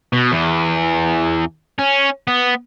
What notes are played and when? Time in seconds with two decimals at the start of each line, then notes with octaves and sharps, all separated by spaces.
0.13 B2
0.32 E2
1.79 C#4
2.28 B3